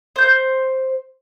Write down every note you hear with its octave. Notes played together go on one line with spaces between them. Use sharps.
C5 G6